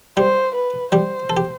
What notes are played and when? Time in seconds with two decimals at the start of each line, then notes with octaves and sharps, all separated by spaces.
0.17 G3 G4 C5
0.55 B4
0.92 G3 G4 C5
1.30 A4
1.37 G4